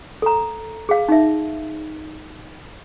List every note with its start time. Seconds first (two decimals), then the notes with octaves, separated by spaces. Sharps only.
0.22 A4 A#5
0.89 G#4 F5
1.08 D#4 E5